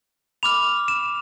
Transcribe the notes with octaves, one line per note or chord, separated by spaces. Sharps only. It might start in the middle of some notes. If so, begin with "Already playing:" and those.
B5 D6 F6 F7
E7